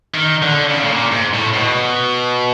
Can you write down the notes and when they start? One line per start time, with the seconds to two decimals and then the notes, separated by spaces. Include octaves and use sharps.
0.15 D#3
0.42 D3
0.70 C#3
0.83 A2
0.92 A#2
1.12 G#2
1.34 A2
1.54 B2